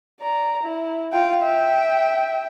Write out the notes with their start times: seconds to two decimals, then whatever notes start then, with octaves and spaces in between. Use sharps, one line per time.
0.21 D5 A#5
0.63 E4
1.12 F4 G5
1.42 E5 G5